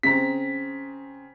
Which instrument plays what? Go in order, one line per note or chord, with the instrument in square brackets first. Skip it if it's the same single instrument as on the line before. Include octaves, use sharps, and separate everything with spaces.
[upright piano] C#3 C4 A#5 [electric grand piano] B6